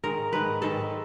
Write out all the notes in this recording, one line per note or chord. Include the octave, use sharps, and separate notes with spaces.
G#2 D#3 G#3 A#4
G#2 D#3 G#3 B4
G#2 D#3 G#3 A4